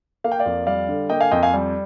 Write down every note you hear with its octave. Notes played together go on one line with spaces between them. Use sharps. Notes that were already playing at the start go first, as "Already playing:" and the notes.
A#3 F5
G5
D5 F5
F2
G3 D5 F5
D3
A#3 D#5 G5
F5 G#5
F2 D#5 G5
F5 G#5
G3